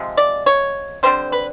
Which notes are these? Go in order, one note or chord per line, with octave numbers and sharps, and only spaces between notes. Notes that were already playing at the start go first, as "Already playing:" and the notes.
Already playing: C3 F3 G#3
D5
C#5
D3 G3 C4 C5
B4